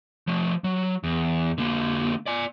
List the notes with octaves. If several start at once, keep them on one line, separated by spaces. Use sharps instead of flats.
F3 A3
F#3
E2
D3 A#3
D5 G#5